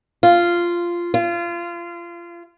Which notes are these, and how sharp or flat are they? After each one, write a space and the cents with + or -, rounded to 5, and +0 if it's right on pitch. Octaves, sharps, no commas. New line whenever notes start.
F4 -10
F4 -25